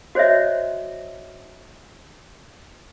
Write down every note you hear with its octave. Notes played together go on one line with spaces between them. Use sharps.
F#4 C5 C#5 D#5 E5